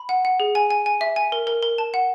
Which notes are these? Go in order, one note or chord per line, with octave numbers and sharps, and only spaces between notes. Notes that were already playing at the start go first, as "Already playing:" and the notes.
Already playing: B5
F#5
F#5
G#4
G#5
G#5
G#5
E5
G#5
A#4
A#4
A#4
A5
F#5